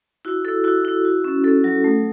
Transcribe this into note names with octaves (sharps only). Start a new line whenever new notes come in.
E4 F#4
E4 A4
E4 F#4
E4
F#4
C#4
C#4 A4
F#3
A3